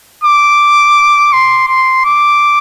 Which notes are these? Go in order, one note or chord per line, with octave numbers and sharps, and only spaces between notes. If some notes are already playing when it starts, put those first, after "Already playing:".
D6
C6
C6
D6